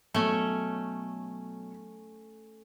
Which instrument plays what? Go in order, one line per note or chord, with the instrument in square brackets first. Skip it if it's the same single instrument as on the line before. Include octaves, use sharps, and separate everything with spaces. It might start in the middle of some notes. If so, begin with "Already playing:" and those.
[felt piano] B2 F#3 [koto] A3 C#4